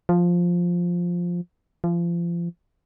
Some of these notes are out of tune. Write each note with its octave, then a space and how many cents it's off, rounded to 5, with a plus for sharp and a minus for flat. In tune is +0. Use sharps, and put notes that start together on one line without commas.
F3 +5
F3 -30